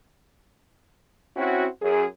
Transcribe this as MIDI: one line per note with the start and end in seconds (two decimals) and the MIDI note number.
1.37 1.66 60
1.37 1.66 61
1.37 1.66 64
1.37 1.66 66
1.82 2.04 42
1.82 2.04 68